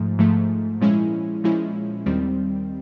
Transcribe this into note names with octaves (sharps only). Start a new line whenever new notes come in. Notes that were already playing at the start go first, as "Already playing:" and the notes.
Already playing: G#2 F3 A3
G#2 F3 A3
A#2 F3 G#3 C#4 E4
A#2 F3 G#3 C#4 E4
D#2 D#3 G3 C4